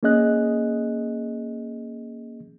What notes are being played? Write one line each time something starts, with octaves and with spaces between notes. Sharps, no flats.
A#3 C#4 G#4 D#5 F#6